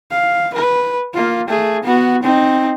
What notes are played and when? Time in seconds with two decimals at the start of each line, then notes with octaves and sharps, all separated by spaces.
0.11 F5
0.54 B4
1.14 A#3 F4
1.48 A3 G#4
1.84 B3 F#4
2.23 C4 D#4